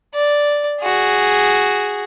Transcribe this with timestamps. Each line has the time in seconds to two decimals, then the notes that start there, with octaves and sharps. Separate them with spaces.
0.15 D5
0.81 F#4 G#4